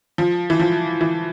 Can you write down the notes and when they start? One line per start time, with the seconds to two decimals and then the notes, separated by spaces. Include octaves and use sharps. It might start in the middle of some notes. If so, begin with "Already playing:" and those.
0.18 F3
0.50 E3
0.60 F3
1.01 E3